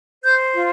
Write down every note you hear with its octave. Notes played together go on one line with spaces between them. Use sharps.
C5 G6
F4